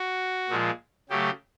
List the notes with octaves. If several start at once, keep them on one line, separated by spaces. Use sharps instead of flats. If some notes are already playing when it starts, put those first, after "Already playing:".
Already playing: F#4
A#2 F3 G#3
C#3 F#3 A3 G4